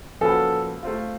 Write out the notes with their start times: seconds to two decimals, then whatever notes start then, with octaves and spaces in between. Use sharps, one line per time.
0.21 F3 A#3 C#4 F#4 A4 B4
0.83 A3 C4 F4